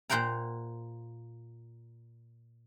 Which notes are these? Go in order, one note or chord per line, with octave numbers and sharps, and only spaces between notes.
A#2 C5 F#5 G5 A#5